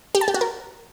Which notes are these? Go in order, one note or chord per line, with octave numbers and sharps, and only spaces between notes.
G4
A5
G4
F#4
A#4